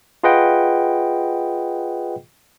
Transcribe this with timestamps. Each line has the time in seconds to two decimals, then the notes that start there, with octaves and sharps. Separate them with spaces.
0.23 F4 G#4 B4 D#5 F#5 G5